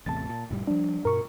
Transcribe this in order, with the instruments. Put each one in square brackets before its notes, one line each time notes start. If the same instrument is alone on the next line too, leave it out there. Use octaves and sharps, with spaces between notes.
[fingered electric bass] A1 E2 C3 [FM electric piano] A5 A6
[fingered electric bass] A#2
F1 A2 G3
[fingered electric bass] F3 G3 [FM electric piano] D4
[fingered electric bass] G2 B2 [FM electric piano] A#4 C#6